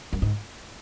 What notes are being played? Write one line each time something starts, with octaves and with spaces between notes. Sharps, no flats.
F#2
G#2